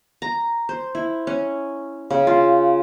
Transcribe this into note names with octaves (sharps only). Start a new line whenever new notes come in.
A#5
C5
E4
C#4
C#3
F4